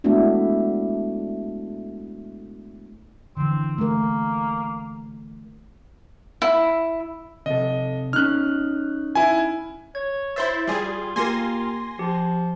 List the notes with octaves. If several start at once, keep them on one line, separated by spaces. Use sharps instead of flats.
G#3 A3 B3 D4 E4 F#4
D3 E3 C4
A3 A#3 A#4
E4
C3 A4 D#5
C#4 D#4 F6 F#6
E4 G#5
C#5 G#6
E4 C5 E5 C6 A6
G3 F4 G#4
A#3 F4 G4 A#4 G#5 C6 A#6
F3 G4